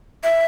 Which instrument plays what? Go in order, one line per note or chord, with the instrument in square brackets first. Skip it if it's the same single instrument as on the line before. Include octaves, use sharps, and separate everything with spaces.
[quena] E5